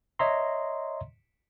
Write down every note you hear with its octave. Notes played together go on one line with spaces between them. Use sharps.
C#5 D#5 E5 A#5 C6